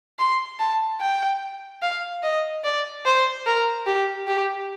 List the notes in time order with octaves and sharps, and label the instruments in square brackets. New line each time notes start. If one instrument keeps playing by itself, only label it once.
[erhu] C6
A5
G5
F5
D#5
D5
C5
A#4
G4
G4